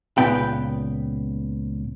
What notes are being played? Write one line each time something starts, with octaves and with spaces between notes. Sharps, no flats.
C#2 A#2 B3 B4 G5